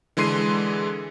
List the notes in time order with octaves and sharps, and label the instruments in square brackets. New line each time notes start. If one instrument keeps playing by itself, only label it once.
[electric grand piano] D3 E3 G#3 C6 C7 D#7